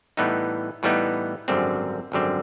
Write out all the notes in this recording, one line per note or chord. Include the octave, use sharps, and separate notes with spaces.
A2 E3 G3 B3 D#4
A2 E3 G3 B3 D#4
G#1 F#2 D3 G3 C4
G#1 F#2 D3 G3 C4